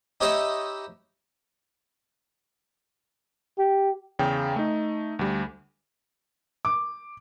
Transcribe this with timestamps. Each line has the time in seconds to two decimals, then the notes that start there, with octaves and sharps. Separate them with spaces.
0.21 D#4 G4 B4 C#5 D#5 E5
3.58 G4
4.19 E2 C#3 G5
4.56 A3 D#4
5.19 D2 G3
6.65 D6